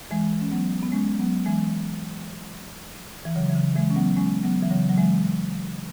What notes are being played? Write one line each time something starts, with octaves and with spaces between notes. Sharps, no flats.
E3 G#3
C#4
F#3 B3
B3
G#3 C#4
F#3 B3
E3 G#3
E3
C#3 F#3
E3
C#3
E3 G#3
C#4
F#3 B3
G#3 C#4
F#3 B3
E3
C#3 F#3
F#3
E3 G#3